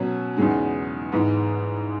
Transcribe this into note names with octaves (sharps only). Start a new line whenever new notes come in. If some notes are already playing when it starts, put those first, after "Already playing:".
Already playing: B2 F#3 C#4
E2 C#3 G#3 D#4
G#2 E3 G#3 B3 D#4